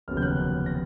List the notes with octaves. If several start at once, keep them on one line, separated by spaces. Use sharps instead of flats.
F1 D#2 C#3 F#3 B3 F6
G6
F#6
F#6
A#6